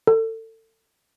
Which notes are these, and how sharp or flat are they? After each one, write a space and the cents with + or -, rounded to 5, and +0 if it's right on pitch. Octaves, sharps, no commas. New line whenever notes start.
A4 +30